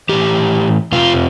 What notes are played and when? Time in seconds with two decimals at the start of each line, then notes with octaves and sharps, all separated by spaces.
0.09 A2 E3 G4
0.92 F2 C3 F3 F4